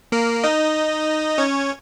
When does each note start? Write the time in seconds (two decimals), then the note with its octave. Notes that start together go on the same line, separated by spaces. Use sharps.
0.12 A#3 A#4
0.44 D#4 D#5
1.38 C#4 C#5